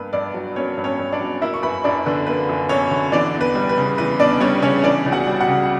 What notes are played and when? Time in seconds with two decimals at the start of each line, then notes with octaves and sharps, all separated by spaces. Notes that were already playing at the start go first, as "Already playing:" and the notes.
Already playing: G2 A#3 B4
0.13 G2 D4 D5
0.34 F#3
0.56 A#3 C#4 C#5
0.77 G2
0.84 C#4 C#5
0.99 G2
1.12 D4 D5
1.21 F#3
1.42 A#3 E4 E5
1.54 C#6
1.62 F#2 B4 B5
1.84 F#2 D4 D5
2.06 D3 B4
2.27 A#3 B4
2.49 F#2
2.69 F#2 C#4 C#5
2.91 D3
3.12 E3 D4 D5
3.35 E2
3.41 B4
3.55 G3
3.69 B4
3.77 C#3
3.98 E3 B4
4.19 E2 D4 D5
4.40 G3 C#4 C#5
4.63 C#3 C#4 C#5
4.84 E3 D4 D5
5.06 C#2
5.12 F#4 F#5
5.27 G3
5.41 F#4 F#5
5.48 C#3